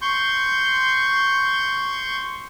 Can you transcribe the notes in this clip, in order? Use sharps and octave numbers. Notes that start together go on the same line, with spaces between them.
C6 C#6 G6